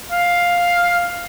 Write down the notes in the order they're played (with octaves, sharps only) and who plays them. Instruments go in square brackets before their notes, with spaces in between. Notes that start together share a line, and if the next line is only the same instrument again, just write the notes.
[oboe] F5